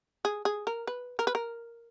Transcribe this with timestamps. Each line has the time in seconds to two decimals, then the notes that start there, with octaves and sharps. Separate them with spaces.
0.25 G#4
0.45 G#4
0.67 A#4
0.87 B4
1.19 A#4
1.27 B4
1.35 A#4